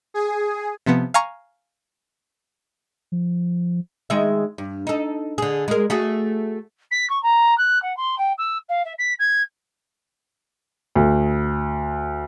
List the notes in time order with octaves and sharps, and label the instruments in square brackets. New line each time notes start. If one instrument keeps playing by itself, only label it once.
[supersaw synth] G#4
[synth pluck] C3 F3 B3
F5 G#5 A#5 C#6
[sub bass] F3
[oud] D#3 G#3 E5
G2
D#4 A4
D3 G#4
G#3 A#4
A3 F#4 G#4
[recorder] B6
C#6
A#5
F#6
F#5
C6
G5
E6
F5
E5
B6
G#6
[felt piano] D2